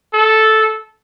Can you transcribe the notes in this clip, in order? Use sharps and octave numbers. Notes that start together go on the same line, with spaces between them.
A4